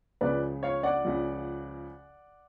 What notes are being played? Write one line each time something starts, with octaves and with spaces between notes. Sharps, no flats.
C#2 C#3 F3 B4 D5
C#5 F5
D5 F#5
C#2 C#3 F3